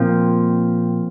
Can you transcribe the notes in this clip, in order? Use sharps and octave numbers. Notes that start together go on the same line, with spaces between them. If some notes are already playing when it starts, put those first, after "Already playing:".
Already playing: A#2 F3 C4 F4 G5